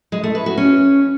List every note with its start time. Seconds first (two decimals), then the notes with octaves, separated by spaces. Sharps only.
0.12 G#3
0.24 A3
0.35 B4
0.46 F#4
0.58 C#4